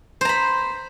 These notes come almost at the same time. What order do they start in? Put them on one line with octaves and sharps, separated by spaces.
C5 A#5 B5